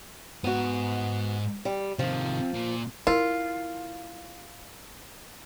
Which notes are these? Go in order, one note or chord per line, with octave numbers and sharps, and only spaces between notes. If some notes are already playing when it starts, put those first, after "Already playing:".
G#2 B3 F#4 G#5
G3
C3 D#3 F3
A#2
E4 F4 A#4